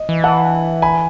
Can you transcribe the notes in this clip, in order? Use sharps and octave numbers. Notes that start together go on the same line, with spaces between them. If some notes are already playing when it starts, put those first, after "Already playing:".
Already playing: D#5
E3
F#5 A5
G#5 B5